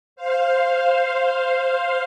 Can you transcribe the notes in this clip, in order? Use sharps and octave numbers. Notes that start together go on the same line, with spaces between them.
C5 F5